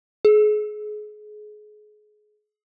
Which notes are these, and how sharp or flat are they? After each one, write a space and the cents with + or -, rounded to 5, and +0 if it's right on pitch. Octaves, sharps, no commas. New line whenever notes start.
G#4 +30